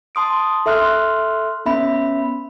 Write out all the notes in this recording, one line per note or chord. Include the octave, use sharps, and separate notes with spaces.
A5 C6 D#6 D7
A4 E5 C6 F6 F#6
B3 C#4 E5 B5